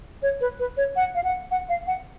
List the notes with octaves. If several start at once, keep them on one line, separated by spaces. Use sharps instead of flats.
C#5
B4
B4
C#5
F#5
F5
F#5
F#5
F5
F#5